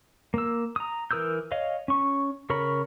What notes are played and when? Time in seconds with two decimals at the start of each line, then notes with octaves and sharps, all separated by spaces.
0.34 A#3 E6
0.76 A#5 D#6
1.11 E3 A#4 D#6 E6 G6
1.52 C#5 D#5 F5
1.88 C#4 C#6
2.50 C#3 A#4 C#5 B5